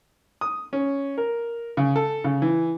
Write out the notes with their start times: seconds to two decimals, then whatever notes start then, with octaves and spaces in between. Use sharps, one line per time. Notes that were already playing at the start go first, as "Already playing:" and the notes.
0.41 D#6
0.73 C#4
1.18 A#4
1.77 C#3
1.96 A4
2.24 C#3
2.42 E3